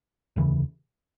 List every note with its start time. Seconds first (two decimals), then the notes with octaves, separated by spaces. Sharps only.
0.36 F1 D#2 C#3 E3